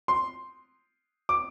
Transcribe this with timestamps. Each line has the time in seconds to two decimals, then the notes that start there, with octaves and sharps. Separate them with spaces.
0.08 C6
1.29 D6